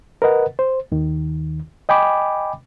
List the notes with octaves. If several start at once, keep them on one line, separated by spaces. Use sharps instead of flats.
A#4 B4 D#5 F#5
C5
D#2 D#3
D#5 G5 G#5 B5 D6